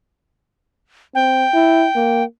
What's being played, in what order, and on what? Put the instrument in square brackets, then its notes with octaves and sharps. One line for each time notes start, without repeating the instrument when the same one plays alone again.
[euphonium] C4 [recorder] G5
[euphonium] E4
A#3